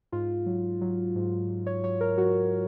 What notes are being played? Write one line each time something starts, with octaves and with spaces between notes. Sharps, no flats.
G#2 F4
F#3
F#3
G#2
G#2
C#5
F#3 C#5
A#4
F#3 F#4